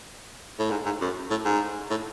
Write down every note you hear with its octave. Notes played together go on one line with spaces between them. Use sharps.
A2
G#2
G#2
F#2
A2
G#2
A2